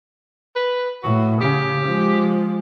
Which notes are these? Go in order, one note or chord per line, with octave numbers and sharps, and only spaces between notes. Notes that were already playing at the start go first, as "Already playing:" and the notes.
B4
A2 F#4
C#3 G4
F3 G#3